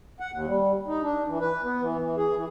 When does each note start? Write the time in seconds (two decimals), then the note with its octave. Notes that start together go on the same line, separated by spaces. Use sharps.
0.20 F#5
0.32 D#2
0.47 G3
0.87 D#4
1.02 D4
1.27 E3
1.40 B4
1.64 B3
1.82 E3
2.01 E3
2.17 G#4
2.36 E3